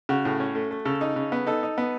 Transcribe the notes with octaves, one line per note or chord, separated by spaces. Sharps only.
C#3 F#4
A2
C#4
A3
A3
C#3 A4
D#4
C#3
B3
D#4 A4
D#4
B3